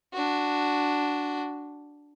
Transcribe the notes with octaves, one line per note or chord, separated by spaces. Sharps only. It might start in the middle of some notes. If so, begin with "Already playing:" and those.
D4 F#4